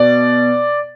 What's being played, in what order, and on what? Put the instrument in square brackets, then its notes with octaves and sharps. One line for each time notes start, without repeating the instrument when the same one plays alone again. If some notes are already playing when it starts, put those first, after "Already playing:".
Already playing: [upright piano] B2 [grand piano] D5